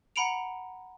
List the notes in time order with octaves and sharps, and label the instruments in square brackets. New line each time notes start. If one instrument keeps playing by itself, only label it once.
[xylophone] F#5 A#5 B5 C#7 D7 F7